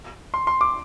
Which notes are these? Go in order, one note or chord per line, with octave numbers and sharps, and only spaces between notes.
C6
C6
D6